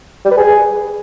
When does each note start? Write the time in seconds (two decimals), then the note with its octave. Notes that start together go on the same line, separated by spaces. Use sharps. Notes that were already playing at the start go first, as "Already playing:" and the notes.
0.25 G3
0.31 B4
0.37 G#4